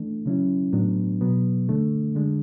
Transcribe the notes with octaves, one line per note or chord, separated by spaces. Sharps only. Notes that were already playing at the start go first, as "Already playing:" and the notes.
Already playing: E3 A3 D4
C#3 F#3 C#4 E4
A2 F#3 B3 D4
B2 F#3 B3
D3 A3 D4
D3 G#3 D4